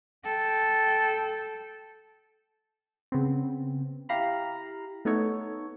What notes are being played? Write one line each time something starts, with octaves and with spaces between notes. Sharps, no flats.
A4 G5
C#3 B3 C4
E4 G4 F5 A#5 B5
A3 B3 D#4 A4 C#5